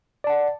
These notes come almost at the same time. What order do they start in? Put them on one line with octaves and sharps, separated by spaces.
D5 A5 F#5